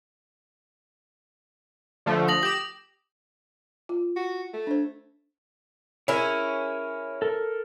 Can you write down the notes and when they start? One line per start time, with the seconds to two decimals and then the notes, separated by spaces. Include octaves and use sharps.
2.06 D3 F3 A3
2.28 D#6 A#6 F#7
2.43 G4 E7 F#7
3.89 F4
4.16 F#4
4.53 A3
4.67 D4 C5
6.08 C#4 E4 G#4 A#4 C#5
7.22 A4 A#4